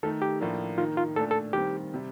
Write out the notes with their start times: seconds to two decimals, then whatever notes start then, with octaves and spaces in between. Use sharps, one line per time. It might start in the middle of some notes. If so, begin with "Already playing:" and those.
0.03 D#3 A3 D#4 A4
0.22 G4
0.41 A2 F3 A#3 D4
0.78 D#3 A#3 D#4 F4
0.97 F4
1.16 A#2 A3 D4 A4
1.31 A4
1.53 D#3 G3 C4 G4
1.94 C3 G3